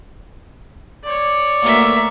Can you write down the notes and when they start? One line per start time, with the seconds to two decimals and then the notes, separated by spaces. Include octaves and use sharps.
1.04 C#5 D5
1.63 D2 A#3 B3 A#4 E5